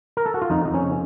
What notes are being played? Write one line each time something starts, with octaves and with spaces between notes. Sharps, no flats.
A#4
A4
F#4
F4
F2 D#4
F2 D#4
C#4
C#3